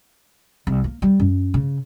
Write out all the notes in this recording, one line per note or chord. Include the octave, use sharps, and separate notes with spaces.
C2
A#3
G3
F#2
C#3